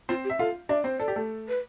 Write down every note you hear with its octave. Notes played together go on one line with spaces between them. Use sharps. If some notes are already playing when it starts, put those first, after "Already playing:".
C4 F4 C5
G4
E5
F4 A4 F5
D4 D5 E5
C4 C5
A4 D5
G4
A3 A4
B4